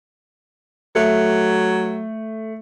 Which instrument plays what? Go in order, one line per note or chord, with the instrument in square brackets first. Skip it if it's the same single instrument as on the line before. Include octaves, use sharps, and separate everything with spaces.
[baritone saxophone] F#3 [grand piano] A3